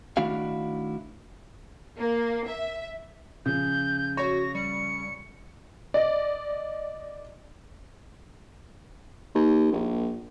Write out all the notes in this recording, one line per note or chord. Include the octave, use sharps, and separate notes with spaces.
D#3 A3 D4 E4 F#4 F5
A#3
E5
C#3 F3 G6
F#4 C#5 A#6
G3 C#7
D5 D#5
D#2
A#1